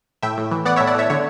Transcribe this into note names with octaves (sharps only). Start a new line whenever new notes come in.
A2 E5 G5
A2
E3
B3 D5 F#5
C#5 E5
A2
D5 F#5
A2 C#5 E5
D3 C#5